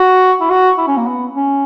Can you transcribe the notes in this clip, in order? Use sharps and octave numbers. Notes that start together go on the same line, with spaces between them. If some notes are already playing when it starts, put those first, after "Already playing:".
Already playing: F#4
E4
F#4
E4
C#4
A#3
B3
C#4